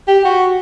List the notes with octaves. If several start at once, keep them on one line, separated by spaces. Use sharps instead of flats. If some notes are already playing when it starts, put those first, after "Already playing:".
G4
F#4